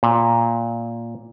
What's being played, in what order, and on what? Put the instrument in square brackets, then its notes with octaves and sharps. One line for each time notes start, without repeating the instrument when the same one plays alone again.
[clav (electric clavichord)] A#2